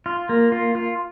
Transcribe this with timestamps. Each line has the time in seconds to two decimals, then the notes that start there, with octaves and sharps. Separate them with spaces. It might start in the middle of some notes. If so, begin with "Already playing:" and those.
0.06 F4
0.29 A#3
0.52 F4
0.75 F4